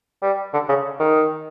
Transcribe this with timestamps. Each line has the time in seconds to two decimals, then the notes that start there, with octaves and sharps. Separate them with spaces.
0.22 G3
0.53 D3
0.69 C#3
1.00 D#3